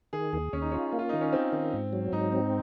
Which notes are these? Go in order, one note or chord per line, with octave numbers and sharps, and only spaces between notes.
D#3 G#4
D#2 G#4
D#2 C#4
D#4
C#4 F4
A#3
F4
D#3 D#4
C#4
C4 D#4
D#3
G#2
F#3
G#2 D#4
C4